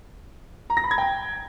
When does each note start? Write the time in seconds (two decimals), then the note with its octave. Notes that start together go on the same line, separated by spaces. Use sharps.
0.70 A#5
0.77 A#6
0.84 B5
0.91 G#6
0.98 G5